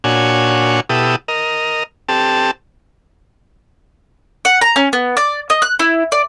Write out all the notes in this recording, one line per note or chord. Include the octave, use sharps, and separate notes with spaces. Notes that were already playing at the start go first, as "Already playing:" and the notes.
A#2 D4 F#4 C#5 G#5
B2 E4 G4 A4 D#6
A#4 D#5
C4 G4 A4 A5
F#5
A#5
C#4
B3
D5
D#5
F#6
E4
D5